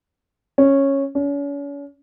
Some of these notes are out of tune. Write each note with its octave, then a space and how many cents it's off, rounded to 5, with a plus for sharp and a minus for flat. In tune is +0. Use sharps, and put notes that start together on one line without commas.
C#4 -10
C#4 +40